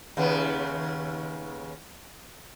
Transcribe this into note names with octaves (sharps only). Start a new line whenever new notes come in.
D#2 C#3 B3